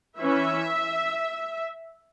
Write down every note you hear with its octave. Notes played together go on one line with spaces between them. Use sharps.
E3 C#4 E5